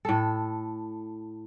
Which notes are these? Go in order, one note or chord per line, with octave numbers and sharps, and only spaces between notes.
A2 A4